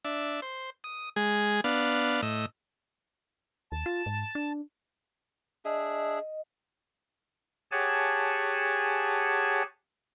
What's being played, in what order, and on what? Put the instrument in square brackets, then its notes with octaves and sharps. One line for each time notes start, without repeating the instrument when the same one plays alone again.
[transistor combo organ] D4 E5
C5
D#6
G#3 G#4
B3 D4 F5
A2 D#5 E6
[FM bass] D#2 [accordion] A5
[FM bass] F4
G#2
D4
[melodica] D4 G#4 E5 [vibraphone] D#5
[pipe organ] G4 G#4 C#5 F#5 G#5 A5